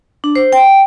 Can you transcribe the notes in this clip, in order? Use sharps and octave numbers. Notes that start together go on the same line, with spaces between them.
D4
C5
G5